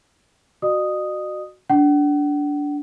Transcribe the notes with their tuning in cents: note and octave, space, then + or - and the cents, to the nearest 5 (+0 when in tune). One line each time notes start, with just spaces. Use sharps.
F#4 +0 D#5 -45 D#6 +0
D4 -15 F#5 +40